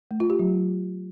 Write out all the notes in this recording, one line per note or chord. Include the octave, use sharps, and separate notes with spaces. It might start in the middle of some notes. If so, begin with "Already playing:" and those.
A3
F4
G4
F#3